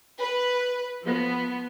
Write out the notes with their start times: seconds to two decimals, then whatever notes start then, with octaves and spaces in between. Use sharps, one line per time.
0.19 B4
1.04 F3 B3